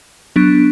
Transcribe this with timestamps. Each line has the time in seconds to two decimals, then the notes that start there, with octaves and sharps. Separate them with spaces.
0.36 F#3 B3 D4